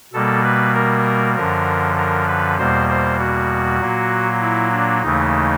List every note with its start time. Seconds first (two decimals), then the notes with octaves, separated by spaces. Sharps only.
0.13 B2 G3 A#3 A4
0.44 B4
0.75 A#4
1.36 F#2 D3 F3 A#4
1.98 A#4
2.28 B4
2.58 E2 B2 G3 A#3 C5
2.89 C5
3.19 F#4
3.80 A#2 F#3 A#3
4.41 E4
4.71 D4
5.02 D#2 C#3 E3 A3 D#4